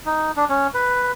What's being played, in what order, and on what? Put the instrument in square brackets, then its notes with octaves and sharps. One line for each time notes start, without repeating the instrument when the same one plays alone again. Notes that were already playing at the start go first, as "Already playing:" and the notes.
[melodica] D#4
D4
C#4
B4